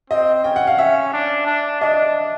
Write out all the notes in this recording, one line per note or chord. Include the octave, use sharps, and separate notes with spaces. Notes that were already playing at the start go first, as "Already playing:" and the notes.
C4 D#5
C#4 G5
F#5
F5
C#4 E5
D4
D4
D4 D#5